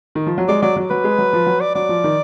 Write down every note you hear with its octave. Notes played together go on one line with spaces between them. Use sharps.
D#3
F3
F#3
G#3 D5
F#3 D5
F#3
F#3 B4
G#3
F#3
F3
F#3
D5
F#3 D5
F3
D#3